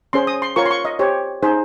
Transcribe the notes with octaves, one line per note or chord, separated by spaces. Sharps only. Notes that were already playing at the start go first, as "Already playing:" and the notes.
C#4 G#4 C5 C6
D#6
C6
F4 A#4 C#5 C#6
C6
C#6
D#5
G4 C5 C#5
D#4 G#4 C5